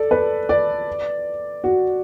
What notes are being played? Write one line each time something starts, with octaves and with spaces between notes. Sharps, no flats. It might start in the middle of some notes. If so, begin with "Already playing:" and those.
Already playing: A4 D5
B4
D5
F#4